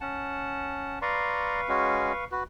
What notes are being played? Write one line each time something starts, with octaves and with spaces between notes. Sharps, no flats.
C#4 F#5 A5
B4 D5 F5 A#5 C6 C#6
G#3 C#4 F#4
F#4 B4